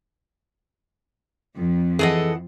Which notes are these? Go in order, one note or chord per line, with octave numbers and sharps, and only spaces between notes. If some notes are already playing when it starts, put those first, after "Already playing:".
F2
E3 G#4 A4 D#5 F#5